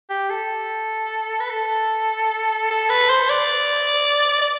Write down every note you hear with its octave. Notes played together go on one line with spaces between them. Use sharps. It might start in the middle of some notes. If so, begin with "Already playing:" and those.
G4
A4
B4
A4
A4
B4
C5
D5
D5